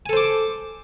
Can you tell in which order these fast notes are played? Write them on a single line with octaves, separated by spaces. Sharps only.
G#5 A4 C5 D6